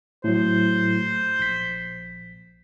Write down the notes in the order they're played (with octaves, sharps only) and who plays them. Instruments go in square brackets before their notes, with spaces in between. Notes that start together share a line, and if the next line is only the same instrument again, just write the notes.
[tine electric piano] A2 F#3 [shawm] C5
[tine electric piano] A#1 B6